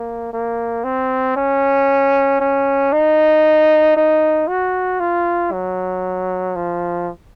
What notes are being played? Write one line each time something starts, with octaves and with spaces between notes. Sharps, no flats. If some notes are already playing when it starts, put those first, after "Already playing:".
Already playing: A#3
A#3
C4
C#4
C#4
D#4
D#4
F#4
F4
F#3
F3